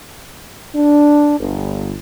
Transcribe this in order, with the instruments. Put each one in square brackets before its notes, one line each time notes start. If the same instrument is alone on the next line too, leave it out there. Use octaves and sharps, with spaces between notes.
[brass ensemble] D4
G1